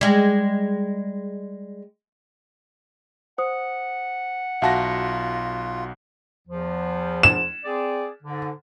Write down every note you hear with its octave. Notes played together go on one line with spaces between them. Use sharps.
G3 G#3
C5 F#5 D#6
B1 F4 F#4 E5 F5 A5 A#6
E2 F3
E7
C4 G#4 D5
G#2 D3